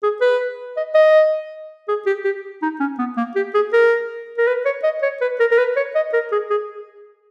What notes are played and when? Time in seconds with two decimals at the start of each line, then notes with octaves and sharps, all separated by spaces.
0.03 G#4
0.21 B4
0.77 D#5
0.95 D#5
1.88 G#4
2.06 G4
2.25 G4
2.62 D#4
2.80 C#4
2.98 B3
3.17 A#3
3.36 G4
3.55 G#4
3.73 A#4
4.38 A#4
4.47 B4
4.65 C#5
4.84 D#5
5.03 C#5
5.21 B4
5.40 A#4
5.51 A#4
5.58 B4
5.76 C#5
5.95 D#5
6.13 A#4
6.32 G#4
6.50 G#4